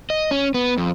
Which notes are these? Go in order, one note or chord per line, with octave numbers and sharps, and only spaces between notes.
D#5
C#4
B3
F2